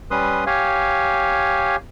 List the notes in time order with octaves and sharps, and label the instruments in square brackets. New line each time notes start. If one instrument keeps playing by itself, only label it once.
[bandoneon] G3 C#4 B4 C6 D#6
G4 C#5 F5 G#5